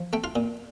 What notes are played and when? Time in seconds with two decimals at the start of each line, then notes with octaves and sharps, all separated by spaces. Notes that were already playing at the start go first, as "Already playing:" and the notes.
Already playing: F3
0.13 A3 G5
0.24 F4 F5
0.36 A#2